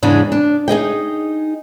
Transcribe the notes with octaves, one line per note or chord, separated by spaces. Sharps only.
E2 G#2 C#3 G#3 D4
D4
D#4 G#4 D#5 G5